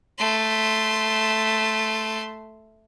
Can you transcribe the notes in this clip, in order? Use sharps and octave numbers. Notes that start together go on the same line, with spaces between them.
A3 C6